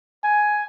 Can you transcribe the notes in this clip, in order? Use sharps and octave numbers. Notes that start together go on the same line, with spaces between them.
G#5